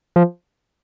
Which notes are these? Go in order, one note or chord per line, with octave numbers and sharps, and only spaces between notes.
F3